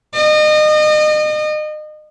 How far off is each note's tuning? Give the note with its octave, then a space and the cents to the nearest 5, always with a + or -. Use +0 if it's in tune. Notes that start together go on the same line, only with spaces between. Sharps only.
D#5 -35